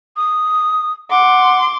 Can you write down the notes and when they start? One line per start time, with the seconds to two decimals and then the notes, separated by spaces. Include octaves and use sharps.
0.16 D#6
1.10 F#5 C6 D6